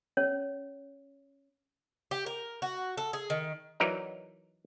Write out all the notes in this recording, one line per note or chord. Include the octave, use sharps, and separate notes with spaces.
C#4 C#5
G4
A#4
F#4
A4
G#4
D#3
E3 F#3 D#4 A#4 D5